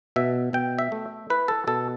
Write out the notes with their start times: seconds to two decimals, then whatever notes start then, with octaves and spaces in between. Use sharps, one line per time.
0.16 B2 E5
0.53 B2 G5
0.79 E5
0.92 A3
1.30 E4 B4
1.48 A4
1.67 B2 A4